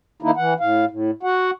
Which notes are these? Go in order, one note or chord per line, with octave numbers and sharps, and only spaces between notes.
D#3 A#3 D#4 E4
E3 F#5
A2 F5
A2
F#4 F#5